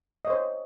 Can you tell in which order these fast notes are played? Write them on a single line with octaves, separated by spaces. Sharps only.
D#5 C#5 C5